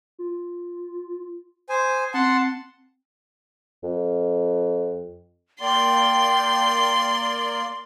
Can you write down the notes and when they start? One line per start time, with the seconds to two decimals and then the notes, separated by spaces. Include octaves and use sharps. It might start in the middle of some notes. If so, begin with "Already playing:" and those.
0.19 F4
1.69 C5 G#5 D#6
2.14 C4 F#5 A5 C6
3.83 F2
5.61 A#3 D5 G5 C6